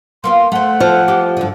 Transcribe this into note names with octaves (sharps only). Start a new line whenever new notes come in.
A#3 B3 F4 C6
A3 C5 F#5
F3 A4
G4
G2 D3